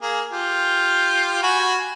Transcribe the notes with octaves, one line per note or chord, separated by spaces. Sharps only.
A#3 G#4
F4 G4
F#4 G#5 B5